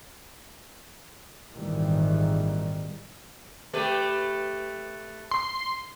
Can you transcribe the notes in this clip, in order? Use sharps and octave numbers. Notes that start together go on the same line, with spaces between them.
G#1 A#2 D#3 E3 G3
A3 G4 B4
C6